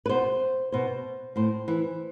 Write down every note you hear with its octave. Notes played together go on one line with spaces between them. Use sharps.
B4
B2 C5
B2 C5
A2 C5
E3